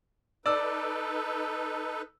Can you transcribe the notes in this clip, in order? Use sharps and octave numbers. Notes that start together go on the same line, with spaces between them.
D#4 A4 B4 D5 E6